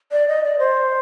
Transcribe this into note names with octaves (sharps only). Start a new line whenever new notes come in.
D5
D#5
D5
C5